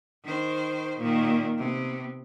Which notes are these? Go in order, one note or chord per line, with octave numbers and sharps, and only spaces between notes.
D#3 C5
A#2 D#3
C3 B3